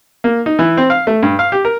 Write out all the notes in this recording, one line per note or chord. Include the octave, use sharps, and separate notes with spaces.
A#3
D#4
E3
C4
F5
A3
G2
F5
G4
A#4